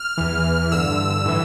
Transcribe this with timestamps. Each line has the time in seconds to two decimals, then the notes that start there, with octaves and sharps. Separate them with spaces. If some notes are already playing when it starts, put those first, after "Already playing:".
Already playing: F6
0.17 E2 E3
0.72 G2 D3 E6
1.26 A2 E3